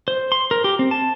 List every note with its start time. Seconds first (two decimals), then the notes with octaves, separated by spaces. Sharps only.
0.08 C5
0.32 C6
0.51 A#4
0.64 G4
0.79 C4
0.91 A5